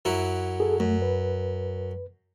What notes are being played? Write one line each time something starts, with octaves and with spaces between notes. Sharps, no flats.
F#2 F#3 E4
G#4 A4
F#2 A3
B4